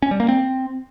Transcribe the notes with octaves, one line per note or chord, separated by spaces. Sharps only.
C#4
G3
A#3
C4